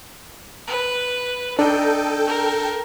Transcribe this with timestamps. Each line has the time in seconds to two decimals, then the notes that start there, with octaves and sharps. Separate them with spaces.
0.68 B4
1.59 D4 D#4 A4 G5 G6
2.26 A#4